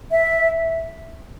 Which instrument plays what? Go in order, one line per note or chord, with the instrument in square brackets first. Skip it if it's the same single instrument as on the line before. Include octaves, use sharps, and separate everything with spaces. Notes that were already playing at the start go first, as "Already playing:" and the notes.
[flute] E5